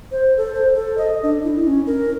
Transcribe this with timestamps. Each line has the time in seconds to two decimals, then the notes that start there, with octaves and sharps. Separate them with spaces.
0.11 C5
0.37 A4
0.54 C5
0.74 A4
0.98 D#5
1.23 D4
1.43 E4
1.66 C#4
1.87 A#4